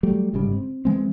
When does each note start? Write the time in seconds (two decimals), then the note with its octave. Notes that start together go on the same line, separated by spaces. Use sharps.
0.03 F#3 G3 A3
0.33 G1 G#2 C#3 G3
0.52 C4
0.85 E3 G#3 C4